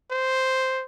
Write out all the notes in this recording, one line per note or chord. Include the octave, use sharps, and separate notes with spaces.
C5